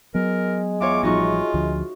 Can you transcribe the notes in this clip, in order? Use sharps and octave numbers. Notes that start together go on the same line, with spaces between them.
F#3 G#3 B3 A#4
E2 F4 C#5 D6
A1 F3 G3 D#4 F4 F#4 C#6
D2 D3 F3